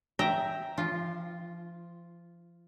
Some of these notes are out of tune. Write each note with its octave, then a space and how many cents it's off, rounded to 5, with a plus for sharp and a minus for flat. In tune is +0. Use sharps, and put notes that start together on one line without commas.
E5 +0 G5 +0 A#5 +5
F3 -30 F4 +0